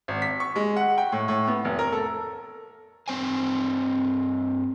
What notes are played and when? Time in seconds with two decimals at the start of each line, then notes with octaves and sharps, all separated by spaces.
0.08 G#1
0.22 B6
0.40 C#6
0.56 G#3
0.76 F#5
0.98 G5
1.12 A2
1.28 A2
1.47 B3
1.65 F1
1.79 A#4
1.92 A4
3.08 G2 C4 C5 G#5